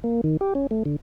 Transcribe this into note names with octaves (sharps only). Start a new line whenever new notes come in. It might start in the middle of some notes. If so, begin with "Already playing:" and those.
A#3
D#3
G4
C#4
A3
D3